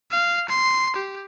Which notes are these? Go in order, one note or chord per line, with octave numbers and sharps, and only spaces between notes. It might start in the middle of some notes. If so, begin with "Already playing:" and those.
F5
C6
G4